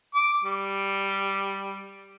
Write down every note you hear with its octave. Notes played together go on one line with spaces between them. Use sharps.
D6
G3